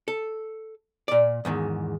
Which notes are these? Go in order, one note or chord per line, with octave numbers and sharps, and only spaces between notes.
A4
A#2 D5
E2 G#2 D#3